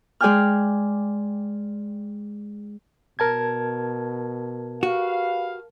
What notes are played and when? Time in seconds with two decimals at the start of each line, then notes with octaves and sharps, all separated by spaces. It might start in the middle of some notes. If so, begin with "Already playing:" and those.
0.21 G#3 G#4 D5 G5 G#5 F6
3.19 B2 A#4 A5 G#6
4.83 F#4 G4 B4 F5